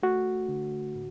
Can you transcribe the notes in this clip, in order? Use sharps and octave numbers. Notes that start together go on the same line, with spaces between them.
A3 F#4
D3
A2